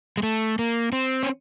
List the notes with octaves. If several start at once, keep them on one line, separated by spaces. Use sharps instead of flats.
G#3
A3
A#3
C4
C#4